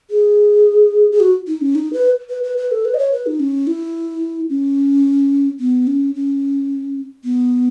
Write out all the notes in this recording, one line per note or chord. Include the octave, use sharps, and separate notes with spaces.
G#4
G#4
F#4
D#4
C#4
D#4
B4
B4
B4
B4
A4
B4
D#5
C#5
B4
D#4
C#4
E4
C#4
B3
C#4
C#4
B3